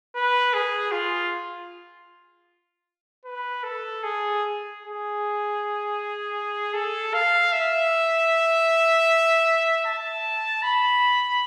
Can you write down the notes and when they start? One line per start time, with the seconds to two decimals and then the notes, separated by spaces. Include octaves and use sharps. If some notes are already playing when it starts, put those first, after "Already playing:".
0.16 B4
0.54 G#4
0.92 F4
3.25 B4
3.64 A4
4.04 G#4
4.81 G#4
6.74 A4
7.14 F5
7.53 E5
9.85 A5
10.63 B5